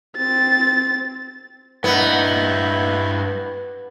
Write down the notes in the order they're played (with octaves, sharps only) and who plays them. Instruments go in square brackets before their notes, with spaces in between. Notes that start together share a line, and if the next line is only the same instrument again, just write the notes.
[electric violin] C4 A6
[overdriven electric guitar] G2 D#4 [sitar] B3 [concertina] E4